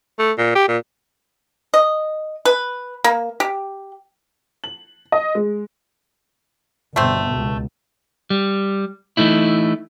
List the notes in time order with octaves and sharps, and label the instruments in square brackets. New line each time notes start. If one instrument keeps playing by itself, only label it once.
[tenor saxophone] A3
A#2
G4
A#2
[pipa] D#5
B4
A#3
G4
[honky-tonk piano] F#7
D#5
G#3
[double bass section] G1 B2 [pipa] A3 C4
[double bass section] C#2
[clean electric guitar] G3
E3 A3 D#4 E4